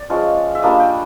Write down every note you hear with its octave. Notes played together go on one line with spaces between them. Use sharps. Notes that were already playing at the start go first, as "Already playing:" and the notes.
Already playing: D5
F3 G#3 C#4 F4
E5
G3 A#3 D4 F4 D#5
G5